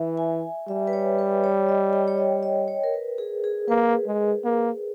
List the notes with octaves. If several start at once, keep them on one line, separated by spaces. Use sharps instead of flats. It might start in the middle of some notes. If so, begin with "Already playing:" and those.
Already playing: E3 E5
G#5
G3 E5
B4
C#5
B4
C#5
D#5
G5
C#5
D#5
D#5
C#5
A#4
B4
G#4
G#4
A#3 B4
G#3
A#3